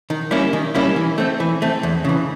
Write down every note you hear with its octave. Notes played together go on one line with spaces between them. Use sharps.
D#3
G3 A#3 C#4 E4
D#3
G3 A#3 C#4 E4
E3
A3 C4
E3
A3 C4
E2
C#3 E3